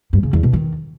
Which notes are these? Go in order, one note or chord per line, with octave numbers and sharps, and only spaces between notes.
G2
C#3
E2
B2
D#3